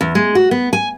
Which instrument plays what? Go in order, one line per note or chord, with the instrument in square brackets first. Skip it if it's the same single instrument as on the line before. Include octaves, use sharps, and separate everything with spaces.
[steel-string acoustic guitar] E2
G#3
F#4
B3
G#5